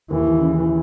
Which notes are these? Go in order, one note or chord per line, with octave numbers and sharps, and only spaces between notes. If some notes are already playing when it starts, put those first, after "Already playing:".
D#2 E3
C#3